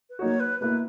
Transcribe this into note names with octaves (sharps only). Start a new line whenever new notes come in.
B4
F#3 A#3 D#4 F#4 C#5
B4
B2 A#3 E4 B4